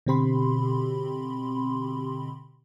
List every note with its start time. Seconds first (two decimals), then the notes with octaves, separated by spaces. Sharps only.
0.06 B2 D3 C4 G4 B5 C6